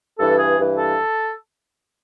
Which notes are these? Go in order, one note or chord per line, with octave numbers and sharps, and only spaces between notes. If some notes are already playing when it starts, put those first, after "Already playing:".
G2 E3 A4
G#4
G2 E3
A4